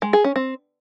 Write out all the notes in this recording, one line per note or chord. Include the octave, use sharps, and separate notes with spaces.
G#3
G#4
C#4
C4